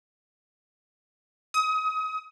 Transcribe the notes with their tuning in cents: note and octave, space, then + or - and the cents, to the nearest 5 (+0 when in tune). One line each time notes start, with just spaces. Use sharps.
D#6 +30